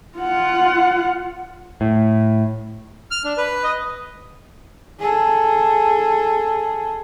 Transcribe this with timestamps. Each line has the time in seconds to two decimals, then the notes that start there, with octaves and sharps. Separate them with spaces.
0.18 F4 F#5
1.81 A2
3.11 F6
3.24 D4
3.38 B4
3.64 D#5
4.99 G#4 A4